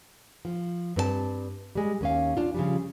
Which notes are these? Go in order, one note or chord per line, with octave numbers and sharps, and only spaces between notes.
F3
G2 C4 A4 A5
G3 G#3
D#2 C#4 F5
D4 F4
C#3 F3 G3